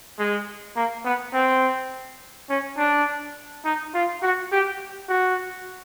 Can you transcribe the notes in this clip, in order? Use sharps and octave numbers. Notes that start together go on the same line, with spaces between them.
G#3
A#3
B3
C4
C#4
D4
D#4
F4
F#4
G4
F#4